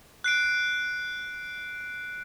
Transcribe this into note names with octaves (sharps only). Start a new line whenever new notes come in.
F#6 C7 D7